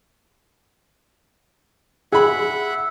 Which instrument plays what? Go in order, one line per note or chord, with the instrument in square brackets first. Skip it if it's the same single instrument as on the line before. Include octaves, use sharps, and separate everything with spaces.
[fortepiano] G#4 B5 [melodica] E5 F#5